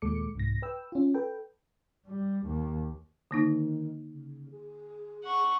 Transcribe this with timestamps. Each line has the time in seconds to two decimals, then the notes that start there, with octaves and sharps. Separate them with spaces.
0.02 D#2 A#2 G#3 A4 D6 C#7
0.35 C2 G#2 A#6
0.62 B4 G5 E6
0.92 C#4 F4
1.14 A4 B4 G5
2.07 G3
2.46 D#2
3.31 D3 D#3 A#3 D#4
4.08 C#3
4.50 G#4
5.24 F#5 C#6